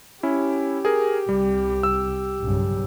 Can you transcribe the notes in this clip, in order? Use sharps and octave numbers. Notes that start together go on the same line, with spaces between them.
C#4 E4 G4
G#4 A#4
C2 G3
E6
B1 G2 C#3